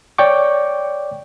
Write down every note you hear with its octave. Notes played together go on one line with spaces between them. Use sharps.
C#5 D5 G5 C#6 D6